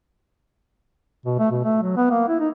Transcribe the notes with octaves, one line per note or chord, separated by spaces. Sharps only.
B2
A3
B2
A3
F#3
B3
A#3
E4
D#4